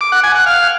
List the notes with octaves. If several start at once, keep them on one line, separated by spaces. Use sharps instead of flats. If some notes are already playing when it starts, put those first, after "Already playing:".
D6
F#5
G#5
F#5
F5